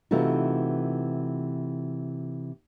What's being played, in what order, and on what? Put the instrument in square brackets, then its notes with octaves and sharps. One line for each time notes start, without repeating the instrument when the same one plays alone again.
[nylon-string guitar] C3 E3 A3 D#4 F4 F#4